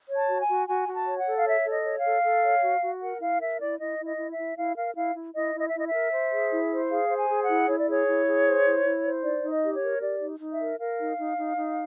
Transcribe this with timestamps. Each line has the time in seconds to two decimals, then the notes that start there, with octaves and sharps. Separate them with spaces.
0.09 C#5
0.16 A5
0.29 F#4
0.42 G#5
0.48 F#4
0.68 F#4 G#5
0.88 F#4
0.93 A5
1.07 C#5
1.19 F#5
1.26 A4
1.36 F5
1.45 C#5 E5
1.65 A4
1.71 D#5
1.84 C#5
1.97 F5
2.05 A4
2.23 A4
2.43 C#5
2.62 F#4
2.82 F#4
3.01 A#4 F#5
3.20 E4 F5
3.41 A#4 E5
3.60 E4 D5
3.79 E4 D#5
3.99 E4
4.05 D#5
4.18 E4
4.31 E5
4.37 E4
4.57 E4 F5
4.76 A#4 F5
4.95 E4 F5
5.15 E4
5.34 E4 D#5
5.54 E4
5.60 D#5
5.69 E5
5.74 E4 D#5
5.86 E5
5.93 A#4
6.12 C5
6.32 G#4
6.51 E4
6.70 C5
6.90 G#4 F5
7.09 C5
7.16 G#5
7.29 G#4
7.42 F#5
7.48 E4
7.67 E4 C#5
7.79 D5
7.87 G#4 C#5
8.07 E4
8.27 G#4
8.46 C5
8.65 E4
8.84 E4
9.04 C5
9.23 D#4 D5
9.42 D#4
9.49 D#5
9.62 G4
9.75 C#5
9.82 A#4
10.01 G4 D5
10.20 D#4
10.40 D#4
10.53 E5
10.60 A#4
10.79 A#4 F5
10.99 D#4
11.18 D#4
11.37 D#4
11.56 D#4